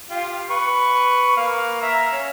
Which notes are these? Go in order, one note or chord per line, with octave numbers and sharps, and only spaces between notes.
F4 G4
B4 C#6
A#3 F5
E5 F5 A#5
C#4 C#5